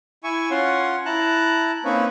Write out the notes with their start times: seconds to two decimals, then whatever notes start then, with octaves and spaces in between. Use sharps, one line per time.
0.24 E4 E5 G#5 C#6
0.51 C#4 F4 C#5 F#5 C6
1.06 E4 A5 A#5 F#6
1.85 A#3 C4 C#4 D#4 B4 C#5